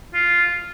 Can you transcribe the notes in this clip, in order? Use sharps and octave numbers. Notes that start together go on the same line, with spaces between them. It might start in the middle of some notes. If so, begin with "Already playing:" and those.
F4